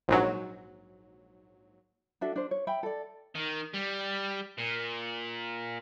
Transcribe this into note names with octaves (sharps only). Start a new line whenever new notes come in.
A#1 G#2 F#3
D4 F#4 A4 E5
D4 C5
C#5
E5 G5 B5
A4 D5
D#3
G3
A#2